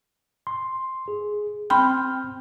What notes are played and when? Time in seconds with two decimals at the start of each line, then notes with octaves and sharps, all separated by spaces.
0.47 C6
1.08 G#4
1.70 C4 G5 B5 C6 F6 G6